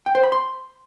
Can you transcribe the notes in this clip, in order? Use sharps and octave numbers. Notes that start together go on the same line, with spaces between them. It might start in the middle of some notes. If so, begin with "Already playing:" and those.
G5
C5
B5
C6